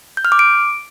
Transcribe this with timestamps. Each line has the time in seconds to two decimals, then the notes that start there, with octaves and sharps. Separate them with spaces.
0.17 G6
0.25 F6
0.32 D6
0.39 D7